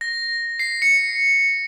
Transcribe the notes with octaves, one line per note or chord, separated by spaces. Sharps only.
A#6
C7
C#7